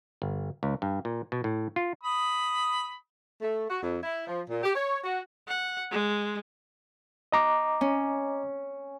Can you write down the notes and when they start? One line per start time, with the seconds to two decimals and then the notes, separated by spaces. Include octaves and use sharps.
0.22 G1
0.63 C#2
0.82 G2
1.05 A#2
1.32 B2
1.44 A2
1.76 F4
2.03 B5 D#6
3.41 A3
3.69 F#4
3.82 F2
4.03 E4
4.26 F3
4.49 A#2
4.63 G4
4.74 C#5
5.04 F#4
5.48 F#5
5.91 G#3
7.32 D#5 A#5 D6
7.81 C#4